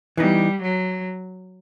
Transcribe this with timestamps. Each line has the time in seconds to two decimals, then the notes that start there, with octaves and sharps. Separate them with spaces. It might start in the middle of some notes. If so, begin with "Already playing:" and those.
0.17 E3 G3 B3 D#4
0.61 F#3